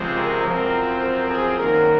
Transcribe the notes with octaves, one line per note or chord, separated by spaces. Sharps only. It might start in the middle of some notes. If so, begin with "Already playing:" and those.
Already playing: C#2 C3 F3 G#3 C4
A#4
F#2 F3 C4
A#4
G#4
F#2 D#3 F#3 A#3 A#4